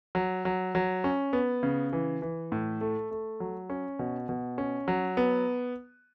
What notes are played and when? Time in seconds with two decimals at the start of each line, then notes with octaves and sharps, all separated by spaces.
0.15 F#3
0.45 F#3
0.75 F#3
1.04 C#4
1.33 B3
1.63 C#3
1.93 E3
2.22 E3
2.52 A2
2.81 A3
3.11 A3
3.40 F#3
3.70 C#4
3.99 B2
4.29 B2
4.58 C#4
4.88 F#3
5.17 B3